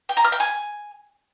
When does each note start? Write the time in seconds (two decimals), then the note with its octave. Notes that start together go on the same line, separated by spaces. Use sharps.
0.09 G5
0.17 A#5
0.24 F6
0.32 G5
0.40 G#5